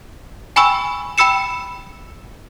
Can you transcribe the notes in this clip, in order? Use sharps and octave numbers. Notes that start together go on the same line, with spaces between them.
G5 G#5 B5 C#6 E6
G5 B5 E6 C#7 E7